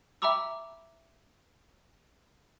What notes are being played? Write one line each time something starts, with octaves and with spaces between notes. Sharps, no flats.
E5 G5 A#5 B5 D6 E6